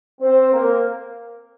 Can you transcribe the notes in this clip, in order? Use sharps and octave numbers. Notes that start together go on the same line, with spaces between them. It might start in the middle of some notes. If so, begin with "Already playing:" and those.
C4 C5
A#3 A#4